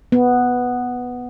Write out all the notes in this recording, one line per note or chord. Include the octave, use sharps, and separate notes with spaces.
B3